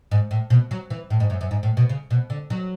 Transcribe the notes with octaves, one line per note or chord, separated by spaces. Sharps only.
G#2
A2
B2
F#3
E3
A2
G#2
F#2
F#2
G#2
A2
B2
C#3
B2
D3
F#3